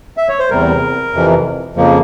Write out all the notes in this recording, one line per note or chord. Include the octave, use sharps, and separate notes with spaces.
E5
C#5
C5
E2 C3 G3 A#4
F2 C3 E3
F2 C#3 F3 A#3